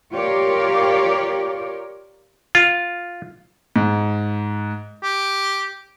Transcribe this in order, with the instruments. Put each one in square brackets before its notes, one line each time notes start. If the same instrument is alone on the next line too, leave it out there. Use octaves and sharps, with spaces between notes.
[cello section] F4 G4 A#4 C#5 D5
[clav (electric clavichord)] F4
[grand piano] G#2
[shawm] G4